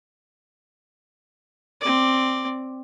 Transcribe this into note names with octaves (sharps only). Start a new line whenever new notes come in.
C4 D5